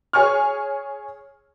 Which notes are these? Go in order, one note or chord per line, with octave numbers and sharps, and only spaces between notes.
G#4 C#5 G#5 C#6 F6